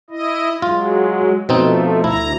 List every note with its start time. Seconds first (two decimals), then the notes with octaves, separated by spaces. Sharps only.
0.10 E4 D#5
0.62 F#3 G#3 F4
1.49 B2 F3 A3 C4 D#4
2.04 D2 E4 A#5